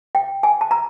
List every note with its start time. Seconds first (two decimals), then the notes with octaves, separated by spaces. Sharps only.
0.15 G5
0.43 G#5
0.61 A5
0.71 A#5